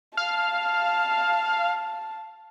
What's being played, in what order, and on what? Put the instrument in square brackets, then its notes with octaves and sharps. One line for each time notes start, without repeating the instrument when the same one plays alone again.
[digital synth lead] F5 [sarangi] A5